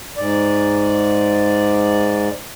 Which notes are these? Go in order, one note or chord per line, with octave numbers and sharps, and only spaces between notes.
G#2 D5